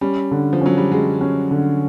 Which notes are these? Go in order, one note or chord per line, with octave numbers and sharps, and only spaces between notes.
G3 C#4
D3
F3
F#3 C#4
G3
F#3 G#3
C#4
D3